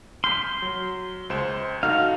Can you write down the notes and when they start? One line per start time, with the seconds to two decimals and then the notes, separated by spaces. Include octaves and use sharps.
0.24 C6 F6 G6 B6
0.62 F#3
1.30 C#2 C5 E7
1.83 D#4 F#4 A4 F5